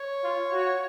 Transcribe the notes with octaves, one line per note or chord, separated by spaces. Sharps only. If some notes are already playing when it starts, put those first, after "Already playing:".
Already playing: C#5
F4
F#4